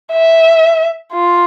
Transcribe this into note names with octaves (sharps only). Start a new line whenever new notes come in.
E5
F4